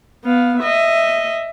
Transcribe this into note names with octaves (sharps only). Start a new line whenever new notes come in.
B3 F5
D#5 E5